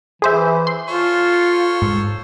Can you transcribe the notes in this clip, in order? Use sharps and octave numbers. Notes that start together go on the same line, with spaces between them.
E3 G#4 C5 E5
C6
F4 A4 C5 C#5
G#2